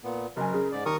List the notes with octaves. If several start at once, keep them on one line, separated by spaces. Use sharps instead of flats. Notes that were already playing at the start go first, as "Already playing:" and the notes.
A#2 B3
F#1 A#4 G#5
C#3
G#2 D5
D#2 A#4 C#6 D#6